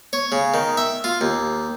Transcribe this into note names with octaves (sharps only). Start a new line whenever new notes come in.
C#5
C#3
D#3
E5
F4
D#2